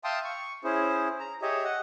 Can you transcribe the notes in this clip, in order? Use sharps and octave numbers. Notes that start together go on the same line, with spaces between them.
E5 F5 G5 A5 C6 D#6
C#6
C#4 E4 G#4 C5
A#5
G4 G#4 C#5 D#5 E5
D#5 F#5